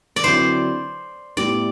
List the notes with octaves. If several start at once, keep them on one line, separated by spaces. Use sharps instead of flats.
D5
D3 F#3 C4 E4 C5
A2 G3 B3 E4 D5